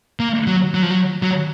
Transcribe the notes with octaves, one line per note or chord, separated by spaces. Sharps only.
A#3
F#3
F#3
F3
F#3
F#3